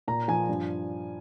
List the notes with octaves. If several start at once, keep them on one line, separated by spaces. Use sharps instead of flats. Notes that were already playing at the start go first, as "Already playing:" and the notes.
A#2 A#5
F3 G#5
G2